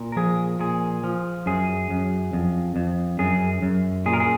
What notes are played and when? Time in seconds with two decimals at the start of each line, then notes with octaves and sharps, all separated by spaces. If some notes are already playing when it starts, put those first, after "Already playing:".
Already playing: A#2
0.12 A#4
0.16 F3 G#4
0.60 A#2 G#4
1.04 F3
1.46 F#2 G#4
1.90 F#2
2.33 F2
2.76 F2
3.19 F#2 G#4
3.62 F#2
4.06 A#2 G#4
4.13 A#4
4.20 G#4